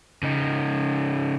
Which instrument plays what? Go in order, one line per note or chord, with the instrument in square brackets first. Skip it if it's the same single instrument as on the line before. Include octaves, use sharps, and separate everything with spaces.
[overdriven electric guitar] C#3 D#4